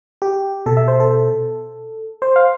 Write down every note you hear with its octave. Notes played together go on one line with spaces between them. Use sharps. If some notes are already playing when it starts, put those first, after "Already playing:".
G4
B2 A4
E5
C5
A4
C5
F5